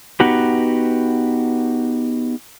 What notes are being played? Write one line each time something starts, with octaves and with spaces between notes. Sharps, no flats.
B3 D#4 F#4 G4 B4